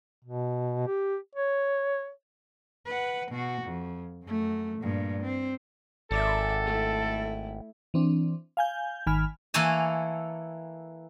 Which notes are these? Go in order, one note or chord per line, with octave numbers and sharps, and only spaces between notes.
B2
G4
C#5
B4 F#5
B2 F#4
F2
F#2 A3
G2 A#2
C4
G#1 A4 D5 E5
A3 E4
E3 C4 D4
F5 G#5 G6
G#1 D#3 G#5 B5 F6
E3 A#3 A4 C#5 G#5 A5